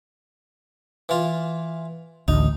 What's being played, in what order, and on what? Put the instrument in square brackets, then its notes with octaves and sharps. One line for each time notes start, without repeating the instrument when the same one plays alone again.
[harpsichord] E3 F4
[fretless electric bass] A1 D2 [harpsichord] D#4